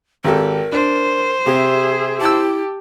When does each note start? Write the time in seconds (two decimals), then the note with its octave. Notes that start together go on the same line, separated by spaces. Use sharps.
0.24 G#1 G4 A4 A#4
0.72 D4 C5
1.46 C3 G4 G#4 E5
2.21 E4 G4 A5 E6